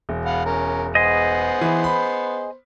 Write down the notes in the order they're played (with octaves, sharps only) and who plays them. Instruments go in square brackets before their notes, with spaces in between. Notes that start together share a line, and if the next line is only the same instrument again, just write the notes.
[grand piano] E1
[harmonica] F5 F#5 B5
C#4 A#4
[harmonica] B3 C5 [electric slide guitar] G#4 D#5
[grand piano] E3
B5